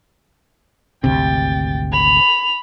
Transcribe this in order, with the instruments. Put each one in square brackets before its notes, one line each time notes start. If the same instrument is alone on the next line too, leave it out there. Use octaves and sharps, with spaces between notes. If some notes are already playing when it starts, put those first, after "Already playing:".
[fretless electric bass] G#1 D2 C3 [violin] G5 A6
[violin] B5 F7